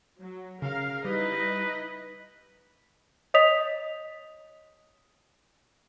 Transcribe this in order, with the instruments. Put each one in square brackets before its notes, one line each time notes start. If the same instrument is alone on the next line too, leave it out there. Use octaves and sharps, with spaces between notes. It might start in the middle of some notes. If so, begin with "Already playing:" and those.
[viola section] F#3
[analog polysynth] C#3 [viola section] A#4 F5
[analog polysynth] G3 [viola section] D#4 E4 D#5 [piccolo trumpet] B4
[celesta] C#5 D#5 D#6 B6 F7